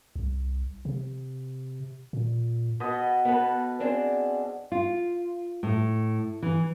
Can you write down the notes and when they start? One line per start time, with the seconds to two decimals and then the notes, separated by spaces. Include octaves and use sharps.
0.16 C2
0.85 C3
2.13 A#2
2.80 B2 B3 D#5
3.25 B3 A4 B4
3.80 C4 D4 G#4
4.72 F4
5.63 A2
6.43 E3